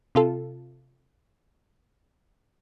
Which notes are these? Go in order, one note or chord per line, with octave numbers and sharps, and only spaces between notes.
C3 F4 A4